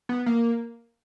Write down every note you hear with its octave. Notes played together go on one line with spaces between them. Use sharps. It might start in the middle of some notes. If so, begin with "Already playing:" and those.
B3
A#3